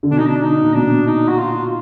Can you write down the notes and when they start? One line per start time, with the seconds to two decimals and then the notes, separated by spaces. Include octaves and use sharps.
0.03 D3
0.11 B2 D4
0.18 D#4
0.27 D4
0.42 D#4
0.63 A#2
0.74 B2 D4
1.07 D#4
1.29 F#4
1.39 F4